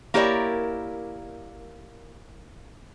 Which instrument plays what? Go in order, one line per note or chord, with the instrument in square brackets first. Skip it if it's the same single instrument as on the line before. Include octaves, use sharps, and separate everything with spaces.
[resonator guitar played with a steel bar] A#3 E4 G4 A#4 C#5 D5